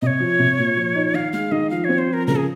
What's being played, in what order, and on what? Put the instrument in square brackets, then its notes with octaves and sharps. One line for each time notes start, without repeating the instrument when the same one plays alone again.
[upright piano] C3 [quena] C#5 D#5
[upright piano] F3
C3
A#2
F3
D#4
[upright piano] D#3 [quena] F5
[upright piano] G#3 [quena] F5
[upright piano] D#3 [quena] D#5
[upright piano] F3 [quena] F5
[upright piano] C4 [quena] C#5
[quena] C5
[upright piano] F3 [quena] A#4
[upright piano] C#3 [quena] A#4
[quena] G#4